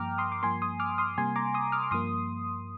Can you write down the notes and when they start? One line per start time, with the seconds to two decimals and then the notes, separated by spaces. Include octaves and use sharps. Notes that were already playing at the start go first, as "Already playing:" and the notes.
Already playing: G2 F3 A#3 G5 A#5 D6 F6
0.18 C6 D#6
0.32 D6
0.43 G2 F3 A#3 G#5 C6
0.62 C6 D#6
0.80 D6 F6
0.98 C6 D#6
1.18 C3 G3 A#3 G#5 C6
1.36 A#5 D6
1.54 C6 D#6
1.72 D6 F6
1.83 D6
1.91 G2 F3 A#3 C6 D#6